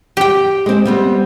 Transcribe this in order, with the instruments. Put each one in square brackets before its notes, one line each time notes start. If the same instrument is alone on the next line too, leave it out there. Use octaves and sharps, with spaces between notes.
[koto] G4 G5
[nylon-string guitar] G#3 C4
G3 B3 C4